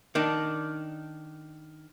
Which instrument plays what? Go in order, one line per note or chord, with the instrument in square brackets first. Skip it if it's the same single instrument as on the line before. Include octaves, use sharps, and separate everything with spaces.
[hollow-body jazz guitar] D#3 D4